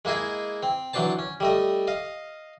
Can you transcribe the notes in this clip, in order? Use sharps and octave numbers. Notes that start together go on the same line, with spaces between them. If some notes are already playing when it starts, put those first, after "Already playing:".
G#3 A#3 E4 G#4 D#5
C4
E3 F#3 D4 C5 A5
C#4
G3 A3 D#5
D#5 F5